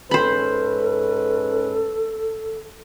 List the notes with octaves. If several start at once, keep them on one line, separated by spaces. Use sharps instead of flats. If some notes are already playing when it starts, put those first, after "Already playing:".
G#2 C#4 A4 B4 C5 B5